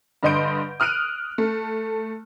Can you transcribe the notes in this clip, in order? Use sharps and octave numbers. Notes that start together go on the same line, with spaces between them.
G2 D3 D#5 C6 G6 D7
D#6 F6 F#6 D7 D#7 F7
A3